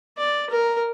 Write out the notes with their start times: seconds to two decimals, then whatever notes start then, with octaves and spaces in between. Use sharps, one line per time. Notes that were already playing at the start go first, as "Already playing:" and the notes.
0.18 D5
0.50 A#4